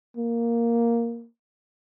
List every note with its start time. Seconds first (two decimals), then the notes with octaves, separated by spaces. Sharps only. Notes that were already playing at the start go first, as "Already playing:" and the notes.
0.17 A#3